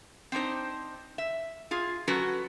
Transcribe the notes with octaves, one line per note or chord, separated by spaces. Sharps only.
C4 D4 D#4 C5
E5
F4 G#4
F#3 C#4 F#4 A4 B4